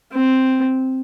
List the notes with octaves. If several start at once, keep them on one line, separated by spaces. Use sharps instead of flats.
C4